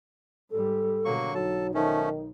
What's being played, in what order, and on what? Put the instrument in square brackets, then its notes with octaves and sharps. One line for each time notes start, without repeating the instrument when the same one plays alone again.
[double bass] G#2 G3 [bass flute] A4
[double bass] B2 D3 [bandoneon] F#3 A#3 C#6
[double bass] B1 [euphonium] F#3 [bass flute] D#4 [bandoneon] A4 A5
[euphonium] D#3 [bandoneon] F3 A3 C#4